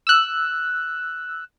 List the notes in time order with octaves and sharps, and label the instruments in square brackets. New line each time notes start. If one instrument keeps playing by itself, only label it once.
[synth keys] E6 F#6